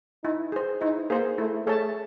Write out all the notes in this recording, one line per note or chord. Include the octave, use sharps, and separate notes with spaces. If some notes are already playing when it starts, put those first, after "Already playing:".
D#4 E4
G#4 C5
D#4 E4
A#3 G#4 C5
A3 E4
A3 G#4 C#5 E5 A5